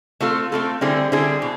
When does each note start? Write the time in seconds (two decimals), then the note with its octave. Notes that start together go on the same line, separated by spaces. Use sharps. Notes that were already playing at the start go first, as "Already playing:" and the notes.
0.20 A3 C4 F4 A4
0.52 A3 C4 F4 A4
0.81 D3 G3 C4 E4 G#4
1.12 D3 G3 C4 E4 G#4
1.42 B2